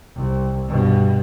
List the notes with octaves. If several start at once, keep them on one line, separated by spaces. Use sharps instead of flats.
C2
G2 B2